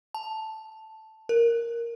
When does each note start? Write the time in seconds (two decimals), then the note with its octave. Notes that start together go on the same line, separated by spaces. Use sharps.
0.14 A5
1.29 A#4